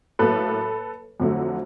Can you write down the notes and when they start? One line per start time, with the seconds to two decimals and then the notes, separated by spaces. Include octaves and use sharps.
0.19 A2 F#3 A#3 A4 B4
1.20 F2 D3 F#3 A3